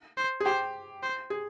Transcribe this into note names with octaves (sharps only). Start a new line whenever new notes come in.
C5
G#4
G4 C5
C5
G#4